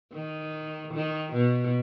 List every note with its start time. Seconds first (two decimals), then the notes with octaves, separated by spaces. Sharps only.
0.13 D#3
0.93 D#3
1.33 B2